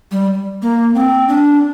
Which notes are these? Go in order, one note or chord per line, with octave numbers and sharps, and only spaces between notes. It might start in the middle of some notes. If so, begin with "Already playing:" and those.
G3
A#3
C4
D4